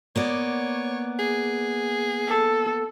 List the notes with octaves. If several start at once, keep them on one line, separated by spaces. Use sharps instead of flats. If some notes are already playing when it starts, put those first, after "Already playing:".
A#3 B3 C#5 D5
G#4
A4